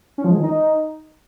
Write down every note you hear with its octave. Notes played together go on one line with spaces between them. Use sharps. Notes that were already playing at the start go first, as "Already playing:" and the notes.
C#4
F3
G#3
D#3
D#4